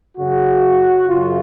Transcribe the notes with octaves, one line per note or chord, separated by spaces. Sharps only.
F#2 C#3 F#4
F#2 C#3 F4